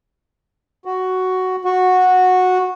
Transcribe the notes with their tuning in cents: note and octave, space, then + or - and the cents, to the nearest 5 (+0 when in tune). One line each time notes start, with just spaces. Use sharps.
F#4 +5
F#4 -10